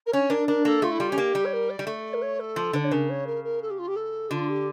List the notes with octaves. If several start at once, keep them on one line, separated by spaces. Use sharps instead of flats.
A#4
C#4 C#5
D4 A#4
D4 A#4
A#3 A4
A3 F4
E4
G3 F4
C#4 G4
A#3
G3
C#5
A#4
D5
G3
A3
A#4
C#5
A4
F3
D3 D5
C#5
C#3 A#4
C#5
A#4
A#4
A4
G4
F4
G4
A4
D3 F4
G4